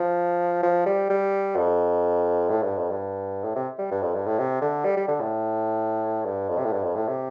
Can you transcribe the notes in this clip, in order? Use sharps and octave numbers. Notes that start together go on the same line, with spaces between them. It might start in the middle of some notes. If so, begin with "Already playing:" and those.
Already playing: F3
F3
G3
G3
F2
A2
G2
F2
G2
A2
C3
G3
G2
F2
G2
A2
C3
D3
G3
G3
D3
A2
G2
F2
C3
A2
G2
F2
A2
C3